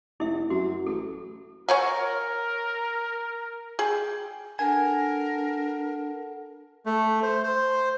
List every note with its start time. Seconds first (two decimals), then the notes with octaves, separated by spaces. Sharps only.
0.20 F1 E4 E5
0.50 F#2 F#4
0.86 A1 A4
1.69 A#4 C#5 F#5 G#5
3.79 G#4 G5
4.59 D4 A4 A#4 F#5 G#5 A5
6.86 A3
7.22 C5
7.43 C5